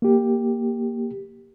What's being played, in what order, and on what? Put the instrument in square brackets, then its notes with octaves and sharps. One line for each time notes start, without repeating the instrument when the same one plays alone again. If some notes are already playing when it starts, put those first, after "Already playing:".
[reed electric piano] A#3 G4